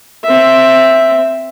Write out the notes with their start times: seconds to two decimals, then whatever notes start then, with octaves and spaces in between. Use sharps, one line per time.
0.24 C4 E5